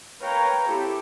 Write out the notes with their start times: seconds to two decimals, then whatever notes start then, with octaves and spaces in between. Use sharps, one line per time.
0.21 A#4 B4 C#5 F5 G5 A#5
0.68 C4 E4 G4 A4